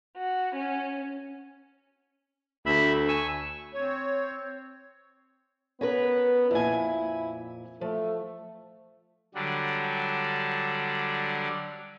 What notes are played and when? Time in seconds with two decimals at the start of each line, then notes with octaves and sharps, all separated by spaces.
0.17 F#4
0.54 C#4
2.66 D2 E5 B5
3.08 G#5 C#6 E6
3.74 C4 C#5
5.81 B3 C#4 A#4 B4
6.51 F2 A#2 E4 G#5
7.81 F3 A3
9.35 D3 F#3 G3 D4